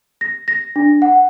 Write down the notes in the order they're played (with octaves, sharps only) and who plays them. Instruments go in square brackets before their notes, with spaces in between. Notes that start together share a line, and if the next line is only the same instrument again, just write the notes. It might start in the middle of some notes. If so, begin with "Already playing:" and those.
[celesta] A#6
A#6
D4
F#5